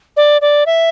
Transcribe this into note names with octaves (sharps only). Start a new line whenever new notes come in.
D5
D5
E5